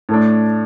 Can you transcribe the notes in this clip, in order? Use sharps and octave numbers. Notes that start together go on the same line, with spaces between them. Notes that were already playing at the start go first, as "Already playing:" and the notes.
A2 A3 D4